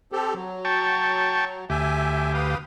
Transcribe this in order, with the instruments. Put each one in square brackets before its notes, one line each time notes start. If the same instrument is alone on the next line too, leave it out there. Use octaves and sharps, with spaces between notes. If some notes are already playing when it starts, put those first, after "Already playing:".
[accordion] C4 G4 A4
F#3
[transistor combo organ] G5 A5 C#6
[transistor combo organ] D2 G4 [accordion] E5 G#5
[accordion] B4 F5 D#6